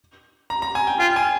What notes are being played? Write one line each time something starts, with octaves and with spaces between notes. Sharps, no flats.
A#5
A#5
G#5
G5
F4 G5
G#5